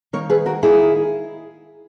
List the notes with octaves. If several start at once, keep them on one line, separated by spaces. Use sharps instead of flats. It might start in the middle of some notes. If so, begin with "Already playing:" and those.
D#3 A#3 D#4 A#4 C#5
G#4 B4
F#4 A#4
D#3 A#3 D#4 E4 G#4